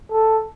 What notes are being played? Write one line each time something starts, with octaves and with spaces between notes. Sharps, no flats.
A4